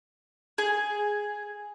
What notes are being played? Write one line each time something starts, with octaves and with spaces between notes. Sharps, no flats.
G#4